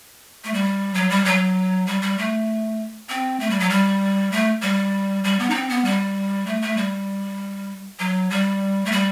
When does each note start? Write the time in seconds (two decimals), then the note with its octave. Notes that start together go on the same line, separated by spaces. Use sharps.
0.44 A3
0.53 G3
0.94 F#3
1.10 G3
1.25 F#3
1.87 G3
2.02 G3
2.18 A3
3.09 C4
3.40 A3
3.50 G3
3.59 F#3
3.70 G3
4.32 A3
4.62 G3
5.24 G3
5.39 B3
5.50 D#4
5.55 C4
5.69 B3
5.84 G3
6.46 A3
6.62 A3
6.77 G3
7.99 F#3
8.30 G3
8.85 A3
8.92 G3